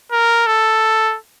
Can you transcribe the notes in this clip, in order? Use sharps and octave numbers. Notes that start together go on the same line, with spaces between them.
A#4
A4